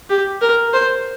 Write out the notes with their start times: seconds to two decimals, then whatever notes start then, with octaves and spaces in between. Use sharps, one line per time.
0.10 G4
0.42 A#4
0.73 C5